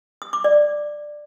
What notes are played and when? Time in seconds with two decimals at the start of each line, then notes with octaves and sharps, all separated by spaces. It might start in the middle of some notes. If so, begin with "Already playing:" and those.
0.22 D#6
0.33 D6
0.44 D5